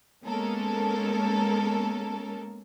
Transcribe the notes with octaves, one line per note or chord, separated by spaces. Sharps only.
G#3 A#3 B3 C#4 A4 A#4